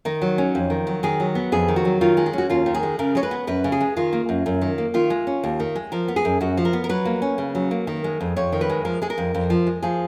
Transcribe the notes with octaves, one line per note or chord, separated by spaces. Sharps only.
D#3 D#4
F#3
C#4
F2
D#3
F#3
D#3 G#4
F#3
B3
F2 G#4
D#3
F#4
F#3
D#3 F4
G#3
G#4
C#4 F#4
D#2 F4
D#3
G#4
G#3
C#3 A#4
G#3 C#5
B4
B3
F#2 B4
C#3
G#4
G#3
D#3 F4
A#3
F#2
F#2
D#3
A#3
D#3 F4
G#3
C#4
D#2
D#3
G#3
F3 A#4
B3
G#4
F#2
F#2 F#4
F3
A#4
B3
A#4
F#3 B4
A#3
C#4
C#3
F#3
A#3
D#3
G#3
F2
F2 C#5
D#3
B4
G#3
F3 A#4
G#3 G#4
A#4
F2
F2
F3
G#3
F3 G#4